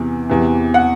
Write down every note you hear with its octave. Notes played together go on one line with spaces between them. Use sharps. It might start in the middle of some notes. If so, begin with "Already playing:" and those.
Already playing: E2 C3 E3
E2 C3 E3
F#5